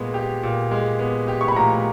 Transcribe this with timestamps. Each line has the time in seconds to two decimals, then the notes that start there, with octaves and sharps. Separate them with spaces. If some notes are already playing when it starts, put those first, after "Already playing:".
Already playing: A#2 G#3 B3
0.14 G4
0.43 A#2
0.71 G#3
0.99 B3
1.28 G4
1.41 C#6
1.48 B5
1.56 A#2 A#5